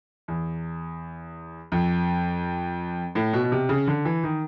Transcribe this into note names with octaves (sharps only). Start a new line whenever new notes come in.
E2
F2
A2
B2
B2
C3
C#3
D3
E3
D#3